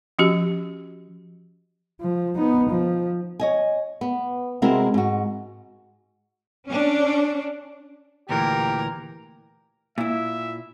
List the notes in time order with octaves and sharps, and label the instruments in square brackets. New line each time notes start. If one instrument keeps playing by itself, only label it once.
[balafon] F3 C#4 F#4 G4
[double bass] F3
B3 D#4
F3
[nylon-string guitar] C#5 D#5 G#5
B3
C3 G#3 C4 E4 F#4 A#4
G#2 F#4
[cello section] C#4 D4
[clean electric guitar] D2 A#2 E3 [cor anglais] G4 [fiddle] A#4
[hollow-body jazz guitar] A#2 E4 [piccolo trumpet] E5